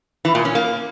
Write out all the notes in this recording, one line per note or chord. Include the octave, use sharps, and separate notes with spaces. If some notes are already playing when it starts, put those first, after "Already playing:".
E3
A#2
C#4
A#3